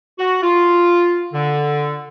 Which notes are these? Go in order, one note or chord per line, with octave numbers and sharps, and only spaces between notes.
F#4
F4
D3